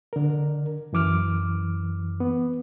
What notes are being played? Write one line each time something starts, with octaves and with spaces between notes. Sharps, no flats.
D3 A#4
F#2 E3 D6 F6
B3